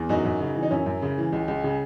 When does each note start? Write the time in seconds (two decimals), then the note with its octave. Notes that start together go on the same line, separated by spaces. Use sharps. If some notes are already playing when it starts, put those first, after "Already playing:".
Already playing: E2
0.09 F#2 D#4 F#4
0.25 F#2
0.40 C#3
0.55 E3
0.63 D#4
0.71 F#2 C#4 E4
0.86 F#2
1.02 C#3
1.18 E3
1.32 C#2
1.48 C#2
1.64 C#3